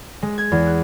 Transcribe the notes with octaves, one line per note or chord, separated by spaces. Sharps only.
G#3
G#6
E2
F#6